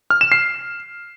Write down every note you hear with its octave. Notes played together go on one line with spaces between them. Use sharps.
F6
E7
C7